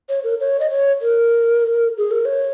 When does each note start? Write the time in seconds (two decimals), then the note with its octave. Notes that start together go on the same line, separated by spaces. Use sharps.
0.09 C#5
0.24 A#4
0.40 C#5
0.60 D#5
0.70 C#5
1.02 A#4
1.98 G#4
2.11 A#4
2.25 C#5